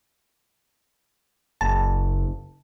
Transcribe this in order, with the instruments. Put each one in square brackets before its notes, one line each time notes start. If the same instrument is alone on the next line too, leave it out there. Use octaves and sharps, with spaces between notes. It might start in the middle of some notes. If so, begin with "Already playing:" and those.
[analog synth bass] F#1 [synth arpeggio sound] A5